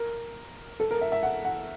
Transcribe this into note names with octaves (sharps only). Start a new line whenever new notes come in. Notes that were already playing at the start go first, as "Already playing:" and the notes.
Already playing: A#4
A4
A#4
E5
E5
F#5
F#5